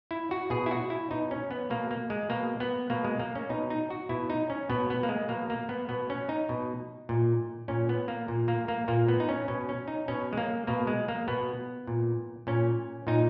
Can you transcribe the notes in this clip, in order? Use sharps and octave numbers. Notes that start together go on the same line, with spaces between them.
E4
F#4
B2 G#4
E4
F#4
E4
B2 D#4
C#4
B3
B2 A#3
A#3
G#3
B2 A#3
B3
B2 A#3
G#3
A#3
C#4
B2 D#4
D#4
F#4
B2 E4
D#4
C#4
B2 B3
B3
A#3
G#3
B2 A#3
A#3
B3
B2 B3
C#4
D#4
B2
A#2
A#2 C#4
B3
A#3
A#2
A#3
A#3
A#2 A#3
B3
D#4
C#4
B2 C#4
C#4
D#4
B2 C#4
G#3
A#3
B2 A#3
G#3
A#3
B2 B3
A#2
A#2 C#4
A#2 D#4